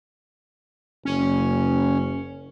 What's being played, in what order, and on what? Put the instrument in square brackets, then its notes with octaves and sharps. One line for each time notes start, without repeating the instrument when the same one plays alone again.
[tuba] F#1 [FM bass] C#4